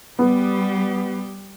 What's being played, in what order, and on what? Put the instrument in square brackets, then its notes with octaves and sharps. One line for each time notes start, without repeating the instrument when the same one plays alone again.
[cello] G3 G4 [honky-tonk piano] B3